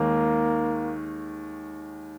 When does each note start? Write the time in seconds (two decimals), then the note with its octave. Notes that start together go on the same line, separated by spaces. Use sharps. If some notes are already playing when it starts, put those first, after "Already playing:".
Already playing: D#2 D#3 G#3 A#3